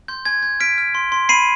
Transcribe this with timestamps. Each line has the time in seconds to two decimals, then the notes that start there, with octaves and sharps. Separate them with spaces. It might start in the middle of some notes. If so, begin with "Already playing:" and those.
0.08 C6 G6
0.25 G#5 G#6
0.43 G6 G#6
0.60 F6 B6 D7
0.78 F6
0.95 C6
1.12 C6
1.29 B5 C7 D#7